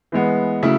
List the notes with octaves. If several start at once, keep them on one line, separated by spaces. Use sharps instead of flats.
E3 G#3 B3
C#3 F#3 A3 E4